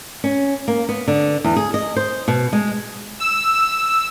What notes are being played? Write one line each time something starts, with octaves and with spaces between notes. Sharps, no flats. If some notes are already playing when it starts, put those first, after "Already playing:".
C#4
A#3
B3
D3
E2
G#4
D#5
C5
B2
G#3
E6